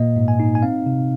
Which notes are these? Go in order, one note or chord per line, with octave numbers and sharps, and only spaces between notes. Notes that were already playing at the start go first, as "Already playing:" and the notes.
Already playing: A#2 A#3 D#5
G#2
G#5
D#4
G#5
C4 F5
C3